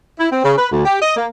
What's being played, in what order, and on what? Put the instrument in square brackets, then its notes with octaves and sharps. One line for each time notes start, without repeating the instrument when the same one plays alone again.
[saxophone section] E4
C4
C#3
B4
D2
G4
D#5
A#3